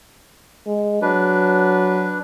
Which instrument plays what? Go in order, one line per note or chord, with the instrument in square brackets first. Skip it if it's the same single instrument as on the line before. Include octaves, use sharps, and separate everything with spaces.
[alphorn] G#3
[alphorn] F#3 [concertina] D4 B4